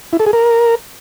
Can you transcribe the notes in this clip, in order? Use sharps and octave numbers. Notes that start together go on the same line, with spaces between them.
E4
A4
G#4
A#4